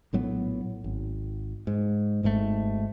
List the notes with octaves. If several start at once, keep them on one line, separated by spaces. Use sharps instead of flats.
A#1 A2 F#3 B3
G#1
G#2
G#1 G#2 C3 A3